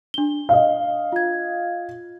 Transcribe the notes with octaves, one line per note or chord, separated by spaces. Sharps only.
D4 G7
D#5 F5
F4 G#6